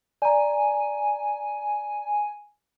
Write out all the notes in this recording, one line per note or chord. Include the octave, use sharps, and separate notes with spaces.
D5 G#5 A#5